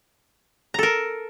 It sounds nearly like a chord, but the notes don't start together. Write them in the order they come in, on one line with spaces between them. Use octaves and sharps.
A#5 A4 A#4